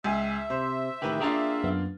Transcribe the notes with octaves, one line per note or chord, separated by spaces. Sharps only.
C#2 E5 G#5
C3 C5
A2 D#3 E3 G4 B4 B5
A#3 D4 F4 G#4 G5 A#5
F#2 B3